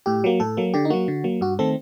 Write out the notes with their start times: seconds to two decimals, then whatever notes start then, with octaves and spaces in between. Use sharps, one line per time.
0.06 A2 G4
0.24 F#3 A#3
0.40 A2 A4
0.57 F#3 A#3
0.74 D3 G4
0.85 D#4
0.90 F#3 A#3 F#4
1.08 D3
1.24 F#3 A#3
1.41 G2 F#4
1.59 D#3 A3 C4 A4